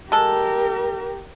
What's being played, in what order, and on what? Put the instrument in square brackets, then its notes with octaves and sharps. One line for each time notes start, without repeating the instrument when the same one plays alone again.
[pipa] G#3 A4 [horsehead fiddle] G4 A#4